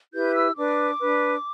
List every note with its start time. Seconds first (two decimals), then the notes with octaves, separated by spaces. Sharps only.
0.14 E4 G4 B4 G6
0.35 E6
0.57 D4 B4 D6
1.00 D4 B4